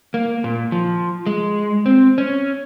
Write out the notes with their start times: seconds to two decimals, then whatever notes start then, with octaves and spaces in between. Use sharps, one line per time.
0.14 A#3
0.44 A#2
0.72 F3
1.26 G#3
1.86 C4
2.18 C#4